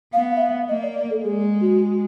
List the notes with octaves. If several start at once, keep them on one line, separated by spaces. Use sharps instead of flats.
B3 F5
E5
F5
A#3 D#5
D5
D5
A4
G#3 G#4
F#4